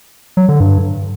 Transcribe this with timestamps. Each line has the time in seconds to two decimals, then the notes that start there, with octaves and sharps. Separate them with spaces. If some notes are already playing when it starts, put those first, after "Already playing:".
0.37 F#3
0.49 D3
0.60 G2